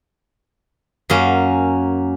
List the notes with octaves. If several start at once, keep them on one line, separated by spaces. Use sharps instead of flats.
F#2 A#3 C#4